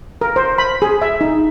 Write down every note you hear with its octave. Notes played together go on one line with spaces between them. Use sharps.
A#4
C5
B5
G#4
E5
D#4